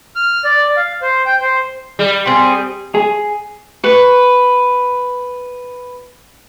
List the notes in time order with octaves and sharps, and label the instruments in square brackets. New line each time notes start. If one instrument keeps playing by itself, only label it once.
[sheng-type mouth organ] F6
D5
F5
C5
G5
C5
[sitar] G3
[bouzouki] C4 G#4
[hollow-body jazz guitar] G#4
[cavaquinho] B4 C#6